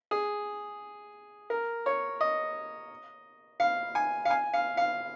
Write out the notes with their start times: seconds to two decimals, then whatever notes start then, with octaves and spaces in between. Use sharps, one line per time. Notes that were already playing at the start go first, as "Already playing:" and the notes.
0.11 G#4
1.50 A#4
1.86 C#5
2.21 D#5
3.60 F5
3.95 G#5
4.25 F5
4.30 G#5
4.54 F5
4.77 F5